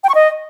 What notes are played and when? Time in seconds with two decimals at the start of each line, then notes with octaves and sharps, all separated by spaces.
0.04 G5
0.09 C#6
0.15 D#5